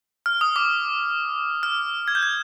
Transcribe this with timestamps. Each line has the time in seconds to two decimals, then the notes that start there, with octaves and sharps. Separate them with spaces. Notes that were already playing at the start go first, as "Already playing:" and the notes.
0.26 F6
0.41 D#6
0.56 D6
1.63 F6
2.08 G#6
2.15 G6
2.23 G#6